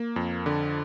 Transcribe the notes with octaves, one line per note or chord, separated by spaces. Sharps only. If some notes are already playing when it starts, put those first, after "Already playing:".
Already playing: A#3
F2
D3